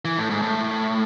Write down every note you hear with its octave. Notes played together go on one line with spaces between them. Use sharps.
E3
A2
G#2
A2